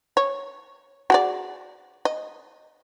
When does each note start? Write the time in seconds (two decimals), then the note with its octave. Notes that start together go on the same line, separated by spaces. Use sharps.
0.17 C#5
1.10 F#4 G#4 D5
2.05 D#5